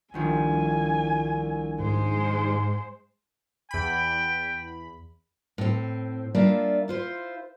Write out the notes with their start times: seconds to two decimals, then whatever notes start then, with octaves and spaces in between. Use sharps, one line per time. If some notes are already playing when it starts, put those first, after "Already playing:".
0.14 C2 G2 D#3 F3 G#5
1.80 G#2 G#3 C5
3.71 E2 G5 B5
5.58 A2 C4
6.35 G3 A#3 D4 F4 D5 E5
6.88 E4 F4 C5